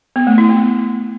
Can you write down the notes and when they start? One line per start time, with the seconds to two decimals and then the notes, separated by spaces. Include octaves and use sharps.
0.16 B3
0.27 A3
0.38 E4
0.49 B3